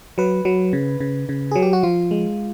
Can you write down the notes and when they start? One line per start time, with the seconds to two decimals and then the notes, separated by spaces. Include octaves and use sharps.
0.18 F#3 B4
0.45 F#3
0.73 C#3
1.00 C#3
1.29 C#3
1.51 F#3 G#4
1.62 G4
1.73 F#4
1.83 F3 F4
2.11 G#3